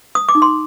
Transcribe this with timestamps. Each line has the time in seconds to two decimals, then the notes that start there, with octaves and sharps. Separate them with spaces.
0.15 D#6
0.29 D6
0.35 D#4
0.42 C6